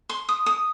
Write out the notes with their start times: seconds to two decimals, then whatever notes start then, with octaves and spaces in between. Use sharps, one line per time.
0.09 C6
0.29 D#6
0.46 D#6